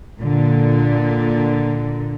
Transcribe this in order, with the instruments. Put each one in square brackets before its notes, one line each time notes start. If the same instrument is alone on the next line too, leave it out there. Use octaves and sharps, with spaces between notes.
[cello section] A#2 D3